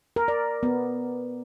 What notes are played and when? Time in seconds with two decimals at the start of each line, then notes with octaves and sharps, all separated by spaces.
0.16 A#4
0.28 D5
0.63 B3